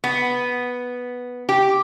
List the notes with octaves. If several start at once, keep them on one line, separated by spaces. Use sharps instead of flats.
B3
G4